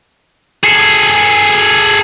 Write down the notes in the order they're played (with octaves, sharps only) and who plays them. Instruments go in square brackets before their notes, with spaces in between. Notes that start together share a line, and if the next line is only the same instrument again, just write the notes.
[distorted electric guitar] G#4 A4